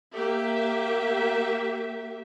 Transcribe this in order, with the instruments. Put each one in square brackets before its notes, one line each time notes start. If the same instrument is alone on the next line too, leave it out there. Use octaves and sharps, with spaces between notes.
[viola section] A#3 G4 E5